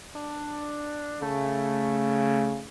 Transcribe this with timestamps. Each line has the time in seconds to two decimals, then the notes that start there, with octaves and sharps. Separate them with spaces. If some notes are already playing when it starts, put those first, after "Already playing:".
0.15 D4
1.22 C#3 A3